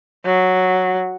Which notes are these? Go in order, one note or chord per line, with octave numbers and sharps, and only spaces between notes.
F#3